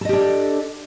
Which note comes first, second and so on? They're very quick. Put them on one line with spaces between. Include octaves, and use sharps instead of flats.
A4 D#5 G4 D4